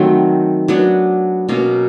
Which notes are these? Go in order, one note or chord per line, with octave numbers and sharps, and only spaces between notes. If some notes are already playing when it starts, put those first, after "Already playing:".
Already playing: D#3 F#3 A3 C4
F#3 B3 D4
B2 F#3 A#3 C#4